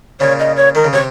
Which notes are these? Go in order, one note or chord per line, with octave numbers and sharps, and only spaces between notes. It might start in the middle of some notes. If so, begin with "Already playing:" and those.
A#2 C#3 C#5
D#5
C#5
D#3 A#4
C#3
C3 C#5